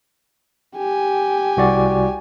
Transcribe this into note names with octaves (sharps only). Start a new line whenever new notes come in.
G4 G#5
C2 F#4 D5